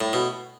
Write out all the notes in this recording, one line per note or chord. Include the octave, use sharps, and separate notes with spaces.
A2
B2